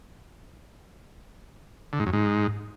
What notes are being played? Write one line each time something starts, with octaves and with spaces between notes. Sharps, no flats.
D3
G#2
F#2
G#2